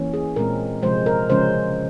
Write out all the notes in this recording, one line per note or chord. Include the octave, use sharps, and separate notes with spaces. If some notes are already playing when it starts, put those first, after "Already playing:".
Already playing: E3 A#3 C#4
G#4
A#2 G#3 C4 A#4
C3 F3 G#3 C5
A#4
C#3 F3 G#3 C#4 C5